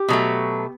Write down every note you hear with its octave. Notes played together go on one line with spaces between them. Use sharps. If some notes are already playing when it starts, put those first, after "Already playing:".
Already playing: G4
B2 F#3 A3